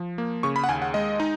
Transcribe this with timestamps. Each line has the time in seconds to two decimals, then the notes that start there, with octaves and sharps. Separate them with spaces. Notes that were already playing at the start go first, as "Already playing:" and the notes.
Already playing: F3
0.18 A#3
0.43 C#3 C#6
0.56 B5
0.64 F#5
0.69 D#2 G#5
0.82 F#5
0.94 G#3 D#5
1.20 D#4